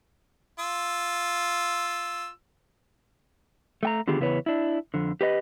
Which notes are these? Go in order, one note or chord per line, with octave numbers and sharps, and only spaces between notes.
F4 E6
A3 G5 A#5
D3 D#3 B3 F4 G4 G#4
E2 C#3 B3 E4 B4 C#5
D4 E4
F2 D3
G4 B4 D#5